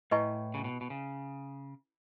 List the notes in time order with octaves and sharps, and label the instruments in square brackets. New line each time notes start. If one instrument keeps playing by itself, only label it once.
[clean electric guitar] A2 [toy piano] E4 B4 D#5 G#5 C#6
[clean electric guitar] C#3
B2
B2
C#3